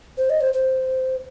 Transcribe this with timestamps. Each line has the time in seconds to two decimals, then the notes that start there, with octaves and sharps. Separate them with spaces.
0.17 C5
0.30 D#5
0.41 C5
0.53 C5